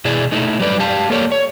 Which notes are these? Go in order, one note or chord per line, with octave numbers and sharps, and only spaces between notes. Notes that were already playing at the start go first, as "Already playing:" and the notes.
B2 E4 G#4 D5
A3 D#4 E4
F#3 G3 B4 D5
G4 F5 A5
A#3 A4 A#4 C#5 D5
C#5